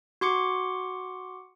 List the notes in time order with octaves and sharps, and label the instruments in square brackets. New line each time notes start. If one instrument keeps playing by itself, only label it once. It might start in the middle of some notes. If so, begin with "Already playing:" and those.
[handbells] F#4 C6 D6 C#7